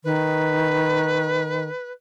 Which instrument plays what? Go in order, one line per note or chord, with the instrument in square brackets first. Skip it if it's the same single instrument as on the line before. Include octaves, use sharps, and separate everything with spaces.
[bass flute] D#3 [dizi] B4